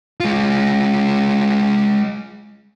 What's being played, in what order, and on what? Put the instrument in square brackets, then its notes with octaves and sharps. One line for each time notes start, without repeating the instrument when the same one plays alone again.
[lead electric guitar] G#3 F4